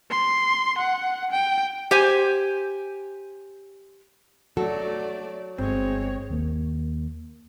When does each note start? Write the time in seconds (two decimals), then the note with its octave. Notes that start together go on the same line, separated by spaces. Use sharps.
0.11 C6
0.78 F#5
1.31 G5
1.91 G4 C5 G#5
4.57 F#3 A3 F#4 A4 D5
5.58 G1 G#3 C4 C#5
6.30 D#2 A#3